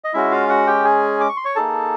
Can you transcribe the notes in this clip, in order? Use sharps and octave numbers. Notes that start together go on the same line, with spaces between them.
D#5
G#3 C#4 E4 F#4 E5
F4 F5
F#4 F#5
G4 G5
G#4 G#5
D6
C#6
C6
C#5 C#6
A#3 D#4 G#4 A4 A5